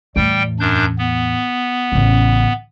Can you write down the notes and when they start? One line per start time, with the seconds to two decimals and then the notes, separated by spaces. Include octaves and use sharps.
0.16 E2 A2 G3 G5
0.60 F#2 D4 G6
0.99 B3
1.92 A1 C#3